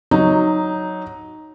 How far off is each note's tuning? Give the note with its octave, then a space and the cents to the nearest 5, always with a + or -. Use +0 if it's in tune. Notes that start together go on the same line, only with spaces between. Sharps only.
F#3 +0 D#4 +0